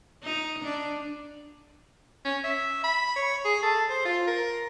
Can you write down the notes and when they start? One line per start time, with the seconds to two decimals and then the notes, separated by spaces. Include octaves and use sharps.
0.24 D#4
0.64 D4
2.25 C#4
2.44 E5
2.84 B5
3.16 C#5
3.44 G#4
3.63 A4
3.90 C5
4.05 F4
4.27 A#4